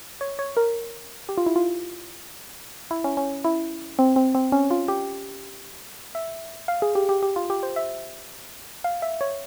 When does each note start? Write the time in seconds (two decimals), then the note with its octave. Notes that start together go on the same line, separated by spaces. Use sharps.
0.21 C#5
0.39 C#5
0.57 A#4
1.29 G4
1.37 F4
1.46 E4
1.56 F4
2.91 E4
3.04 C#4
3.17 C#4
3.44 E4
3.99 C4
4.16 C4
4.35 C4
4.52 C#4
4.71 F4
4.88 G4
6.15 E5
6.68 F5
6.82 G#4
6.95 G4
7.09 G4
7.23 G4
7.36 F4
7.50 G4
7.63 C5
7.76 E5
8.84 F5
9.02 E5
9.21 C#5